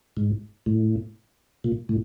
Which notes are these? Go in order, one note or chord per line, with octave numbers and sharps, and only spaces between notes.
G#2
A2
A#2
A2